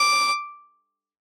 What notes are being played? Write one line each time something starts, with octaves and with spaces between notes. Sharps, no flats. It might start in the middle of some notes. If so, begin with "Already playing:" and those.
Already playing: D6